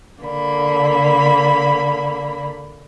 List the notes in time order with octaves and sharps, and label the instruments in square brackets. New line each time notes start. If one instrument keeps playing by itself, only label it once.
[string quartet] D3 A#3 B5